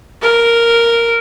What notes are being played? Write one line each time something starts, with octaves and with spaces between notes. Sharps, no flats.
A#4